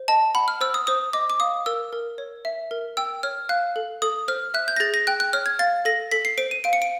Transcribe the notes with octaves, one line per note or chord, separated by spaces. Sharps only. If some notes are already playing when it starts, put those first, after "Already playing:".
Already playing: C5
D#5 A5
F#5 B5
F6
C5 E6
D#6
C5 D#6
D#5 D6
D6
F5 D#6
A#4 E6
A#4
C#5
E5
A#4
G5 E6
C#5 F6
F5 F#6
A4
A4 D#6
C5 F6
E5 F#6
G6
A#6
G#4 A6
A#6
G5 F#6
F#6
C#5 F6
G#6
F5 A6
A4 A#6
A4 B6
C7
C5 D7
D#7
F5 D7
C#7
D7